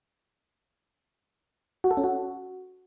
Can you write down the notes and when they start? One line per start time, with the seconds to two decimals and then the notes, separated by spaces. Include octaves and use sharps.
1.84 F#4
1.91 A4
1.97 C#4
2.04 F#4